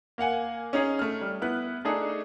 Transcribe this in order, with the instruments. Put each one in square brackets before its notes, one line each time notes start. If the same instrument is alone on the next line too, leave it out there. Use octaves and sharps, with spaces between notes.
[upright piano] A#3 F5 F#5 G#5
C#4 D#4 G#4
A3 F6
G3
B3 E4 B4 F#6
A3 D4 D#4 G#4 A4